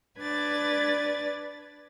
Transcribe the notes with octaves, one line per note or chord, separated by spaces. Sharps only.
D4 B4 D5 G#6 A6